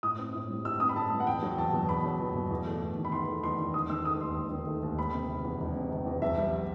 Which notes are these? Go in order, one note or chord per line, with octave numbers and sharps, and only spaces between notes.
A2 D#6
C4
A2
G3
A2 E6
C4 D#6
B5
A2 A5
G3
F#5
E2 G5
F#3
E2 A5
B2
E2 B5
F#3
E2
B2
E2
A3
E2
D#3
B5
E2 C6
A3
E2 C6
D#3
E1 D#6
D#3 E6
A3 D#6
D#2 C6
E1
D#3
A3
D#2
E1 B5
C3
E1
E2
E1
C3
E1
E2
B1 E5
G3